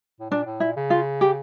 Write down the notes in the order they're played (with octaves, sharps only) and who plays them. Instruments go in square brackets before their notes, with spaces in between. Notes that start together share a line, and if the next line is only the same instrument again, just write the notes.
[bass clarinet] A2
[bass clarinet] A#2 [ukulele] D4
[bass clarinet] A2
[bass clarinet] A#2 [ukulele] E4
[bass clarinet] C#3
[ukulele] F4
G4